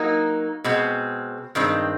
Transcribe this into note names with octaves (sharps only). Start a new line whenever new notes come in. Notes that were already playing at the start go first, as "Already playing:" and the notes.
Already playing: F#3 A#3 D#4
B2 G#3 C4
G2 D#3 G#3 C4